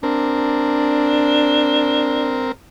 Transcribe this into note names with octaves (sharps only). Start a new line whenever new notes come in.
C4 D4 A#4